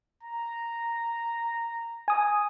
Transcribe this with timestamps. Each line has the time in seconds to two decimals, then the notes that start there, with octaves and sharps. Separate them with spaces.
0.23 A#5
2.08 G#5 D#6